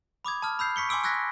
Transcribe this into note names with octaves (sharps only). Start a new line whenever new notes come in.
B5 D6 D#6 G#6
A5 D#6 F6
B5 E6 G6 C7
C#6 B6 C#7 G7
G#5 C6 D6 E6 D7
C#6 E6 F#6 G#6 A#6 B6